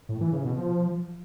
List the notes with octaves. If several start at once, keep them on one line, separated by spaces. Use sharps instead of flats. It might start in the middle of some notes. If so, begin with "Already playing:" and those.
A2
E3
C#3
B2
F3